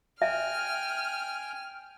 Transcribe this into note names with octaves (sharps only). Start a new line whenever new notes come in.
E5 G5 G#5 F6